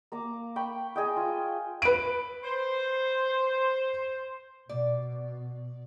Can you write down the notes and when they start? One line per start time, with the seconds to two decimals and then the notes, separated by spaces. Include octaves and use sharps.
0.12 A#3 A#5 D6
0.56 G5 B5 C#6
0.96 G#4 D#5 G5
1.16 F4
1.82 B4 D7
2.44 C5
4.69 B2 D5